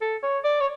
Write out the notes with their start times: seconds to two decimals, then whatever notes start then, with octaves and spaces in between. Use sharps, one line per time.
0.02 A4
0.23 C#5
0.44 D5
0.61 C#5